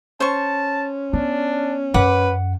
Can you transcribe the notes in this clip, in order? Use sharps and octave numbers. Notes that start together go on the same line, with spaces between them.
C#4 C5 A5 C#6
B3 D4
F#2 B4 F#5 D6